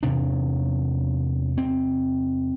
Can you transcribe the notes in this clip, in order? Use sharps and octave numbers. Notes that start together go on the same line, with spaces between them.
E2 C3 D4
C4